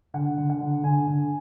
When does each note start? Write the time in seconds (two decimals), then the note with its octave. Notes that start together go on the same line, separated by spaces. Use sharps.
0.14 D3 F#5
0.37 D3
0.50 F#5
0.61 D3
0.83 D3 G#5
1.07 D3